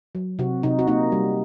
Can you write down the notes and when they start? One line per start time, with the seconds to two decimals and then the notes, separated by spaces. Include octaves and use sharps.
0.15 F#3
0.39 C3 F#4
0.63 C3 D#4
0.79 F#4
0.88 A#3 D#4
1.12 G3